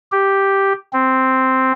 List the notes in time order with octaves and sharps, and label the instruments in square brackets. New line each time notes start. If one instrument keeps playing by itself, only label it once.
[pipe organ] G4
C4